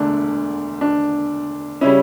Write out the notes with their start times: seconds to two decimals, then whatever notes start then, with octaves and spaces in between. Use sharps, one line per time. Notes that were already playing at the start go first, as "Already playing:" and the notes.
Already playing: E1 D2 D3 A3 D4
0.81 D4
1.81 C#3 G3 C#4 E4